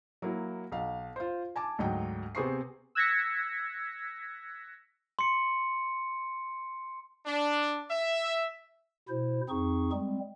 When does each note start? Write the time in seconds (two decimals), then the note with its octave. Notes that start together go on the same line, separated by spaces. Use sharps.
0.22 F#3 A#3 E4
0.72 B1 F5
1.16 F4 C5
1.56 G#5 A5 D6
1.78 D2 G#2 F#3 D#5 G5
2.35 C3 B3 G#4 C5 C#6 C7
2.95 E6 F#6 G#6 A#6 B6 C#7
5.19 C6 C#7
7.25 D4
7.90 E5
9.09 B2 E4 C5
9.49 F2 C4 D#4 G#4 C#6
9.93 G3 G#3 C4